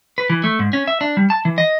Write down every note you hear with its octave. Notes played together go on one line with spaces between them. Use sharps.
B4
E3
A3
G#2
C#4
E5
D4
G3
A5
E3
D#5